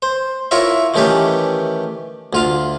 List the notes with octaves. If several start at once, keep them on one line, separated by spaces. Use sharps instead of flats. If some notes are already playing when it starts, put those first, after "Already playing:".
C5
E4 F4 A#4 C#5 E5
D#3 E3 A3 C#4 G4 B4
D2 F4 F5